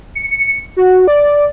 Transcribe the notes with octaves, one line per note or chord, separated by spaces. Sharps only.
C#7
F#4
D5